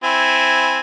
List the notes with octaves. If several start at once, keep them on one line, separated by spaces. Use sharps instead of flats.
C4 E4 G#5